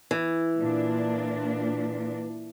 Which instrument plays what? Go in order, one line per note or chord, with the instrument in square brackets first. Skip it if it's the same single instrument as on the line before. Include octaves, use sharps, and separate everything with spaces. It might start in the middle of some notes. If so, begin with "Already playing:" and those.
[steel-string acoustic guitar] E3
[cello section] A#2 D4